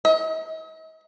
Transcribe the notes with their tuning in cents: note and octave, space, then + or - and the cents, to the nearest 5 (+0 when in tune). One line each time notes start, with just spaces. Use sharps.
D#5 +40